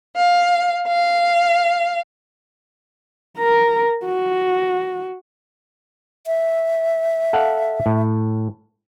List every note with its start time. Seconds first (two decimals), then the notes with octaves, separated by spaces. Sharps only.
0.16 F5
0.88 F5
3.37 A#4 A#5
4.06 F#4
6.27 E5
7.33 A4 F5 F#5
7.86 A2